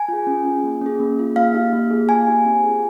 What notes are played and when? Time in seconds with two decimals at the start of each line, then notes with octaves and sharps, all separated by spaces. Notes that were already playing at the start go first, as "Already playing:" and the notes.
Already playing: G#5
0.08 F4 G#4
0.27 C#4
0.45 F4 G#4
0.64 A#3
0.82 C#4 G#4
1.00 A#3
1.18 F4 G#4
1.36 A#3 F5
1.54 D#4 G4
1.73 A#3
1.91 F4 G#4
2.09 A#3 G#5
2.27 D#4 G4
2.45 C4
2.64 F4 G#4